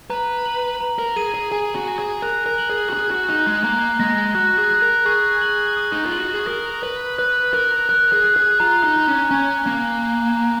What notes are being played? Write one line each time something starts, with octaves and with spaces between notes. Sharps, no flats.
B4 A#5
F#7
A#5
A#4
G#4 D#7
G#4
G#4 G#5
F#4
G#5
G#4
A#4 F#6
A#4
F#7
G#4
F#4
G#4 F#6
F#4
D#4 F#6
G#3
A#3 A#5
G#3 A#6
F#4 F#6
G#4
F#6
A#4
G#4 C#6
F#7
D#6
D#4
F4
F#7
F#4
G#4
A#4 D#6
B4 F#7
B4 F#6
A#4 F#6
A#4 F#6
G#4
F#6
G#4
F4 A#5
D#4
A#5
C#4
C#4 G#5
A#3 G#5
A#5
A#5